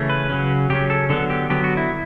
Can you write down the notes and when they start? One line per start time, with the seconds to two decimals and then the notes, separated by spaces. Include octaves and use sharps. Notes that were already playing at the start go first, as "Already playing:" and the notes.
Already playing: C#3 E3 A3 C#4
0.10 B4
0.30 C#3 F#3 C#4
0.70 C#3 F#3 C#4 G4
0.90 A4
1.10 D3 F#3 B3 A4
1.30 G4
1.50 D3 F#3 B3 G4
1.64 F#4
1.77 E4